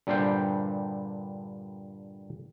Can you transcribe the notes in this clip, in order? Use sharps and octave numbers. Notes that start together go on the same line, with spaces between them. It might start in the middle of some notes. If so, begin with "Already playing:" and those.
G2 A#2 D3 G3 C5 G5